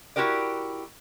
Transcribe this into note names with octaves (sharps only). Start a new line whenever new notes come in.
E4 F#4 G4 A#4 D5